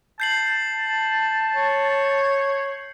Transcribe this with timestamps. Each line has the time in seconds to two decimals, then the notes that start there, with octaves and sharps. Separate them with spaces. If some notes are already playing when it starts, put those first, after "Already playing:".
0.20 A5 G6 C7 F#7
1.55 C#5